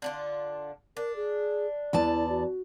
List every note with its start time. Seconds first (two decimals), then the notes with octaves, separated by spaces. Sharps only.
0.02 D3 D4 F4
0.97 D4 A#4
1.16 G#4
1.93 E2 E4 D5 A5
2.29 F#4